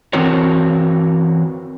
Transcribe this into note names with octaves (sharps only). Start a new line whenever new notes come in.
E3 C4 F#4 A#4 C#5